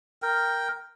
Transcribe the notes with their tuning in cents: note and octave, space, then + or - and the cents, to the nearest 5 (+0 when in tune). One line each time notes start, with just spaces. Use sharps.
A#4 +0 G5 +0